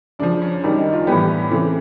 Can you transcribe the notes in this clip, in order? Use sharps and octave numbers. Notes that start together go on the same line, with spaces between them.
F#2 C#3 F3 D4
C#4
F#2 D#3 G3 D4
D#4
F4
A2 E3 G3 B3 G4
C#3 E3 A3 C4